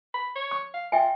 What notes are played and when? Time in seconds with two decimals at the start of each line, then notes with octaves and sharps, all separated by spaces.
0.14 B5
0.36 C#5
0.51 C#6
0.74 F5
0.92 F4 E5 G5 G#5